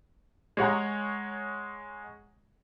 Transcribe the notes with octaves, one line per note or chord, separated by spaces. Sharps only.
G#3 C#5 F#5 A#5